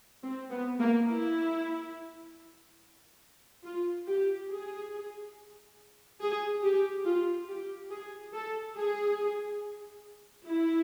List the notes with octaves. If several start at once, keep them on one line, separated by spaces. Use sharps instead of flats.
C4
B3
A#3
E4
F4
G4
G#4
G#4
G4
F4
G4
G#4
A4
G#4
E4